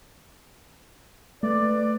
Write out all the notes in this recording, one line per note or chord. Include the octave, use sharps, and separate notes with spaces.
A3 B4 D5